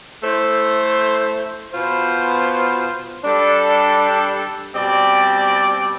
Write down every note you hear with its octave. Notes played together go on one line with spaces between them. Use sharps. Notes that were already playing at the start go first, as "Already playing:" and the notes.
A3 E4 A4 C5
B2 B3 F4 C5
G3 D4 A4
B2 G3 C4 G4 D5